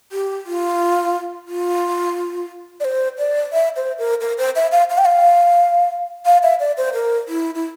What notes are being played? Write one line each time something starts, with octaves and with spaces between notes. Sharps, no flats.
G4
F4
F4
D5
C5
D5
E5
C5
A#4
A#4
C5
E5
F5
F5
G5
F5
F5
E5
D5
C5
A#4
E4
E4